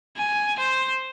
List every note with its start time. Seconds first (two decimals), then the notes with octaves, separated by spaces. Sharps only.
0.17 G#5
0.59 C5